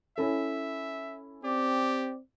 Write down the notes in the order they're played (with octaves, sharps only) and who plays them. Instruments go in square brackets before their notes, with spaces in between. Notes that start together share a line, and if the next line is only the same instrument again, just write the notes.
[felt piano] C#4 E4 A4 [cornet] E5
[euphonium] C4 [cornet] G4 [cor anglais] D5